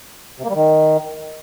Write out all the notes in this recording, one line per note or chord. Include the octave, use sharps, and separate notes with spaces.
C3
A#3
G3
D#3